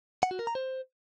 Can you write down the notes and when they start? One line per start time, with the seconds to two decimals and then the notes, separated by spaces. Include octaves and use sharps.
0.23 F#5
0.31 F#4
0.39 A#4
0.47 A#5
0.55 C5